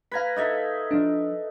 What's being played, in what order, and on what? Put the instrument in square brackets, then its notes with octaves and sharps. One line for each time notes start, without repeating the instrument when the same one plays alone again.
[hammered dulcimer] B4 A#5 [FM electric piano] F5 G#6 B6
[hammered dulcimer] D#4 A4 E5
[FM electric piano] F3 D4